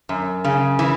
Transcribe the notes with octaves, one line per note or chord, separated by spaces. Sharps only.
F#2
C#3
E3